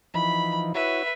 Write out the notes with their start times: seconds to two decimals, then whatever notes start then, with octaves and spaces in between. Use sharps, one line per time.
0.14 E3 F3 D#4 B5
0.75 E4 F#4 B4 C#5 E5